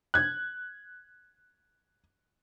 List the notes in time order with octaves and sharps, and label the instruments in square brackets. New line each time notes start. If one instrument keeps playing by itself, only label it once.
[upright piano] F#6 G#6